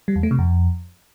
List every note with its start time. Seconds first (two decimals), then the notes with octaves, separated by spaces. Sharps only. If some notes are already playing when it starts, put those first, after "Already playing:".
0.08 G3
0.16 E2
0.23 A3
0.31 C3
0.39 F2